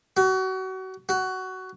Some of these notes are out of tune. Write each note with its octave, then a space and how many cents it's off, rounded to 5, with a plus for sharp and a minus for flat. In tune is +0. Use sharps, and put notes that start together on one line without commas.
F#4 +30
F#4 +15